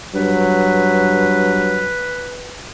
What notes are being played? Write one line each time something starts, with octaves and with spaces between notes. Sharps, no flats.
G2 F#3 B4